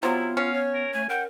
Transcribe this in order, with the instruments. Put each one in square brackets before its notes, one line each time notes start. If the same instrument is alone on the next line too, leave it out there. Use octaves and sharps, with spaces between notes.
[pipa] C3 F#3 [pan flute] B3 [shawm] E4 [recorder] F4
[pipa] C#4 [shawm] F5
[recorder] C#5
[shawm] A#4
[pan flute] A3 [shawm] G#5
[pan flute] A#4 [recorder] F#5 [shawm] G5